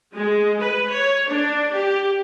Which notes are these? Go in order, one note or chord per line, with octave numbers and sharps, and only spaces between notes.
G#3
B4
C#5
D4
G4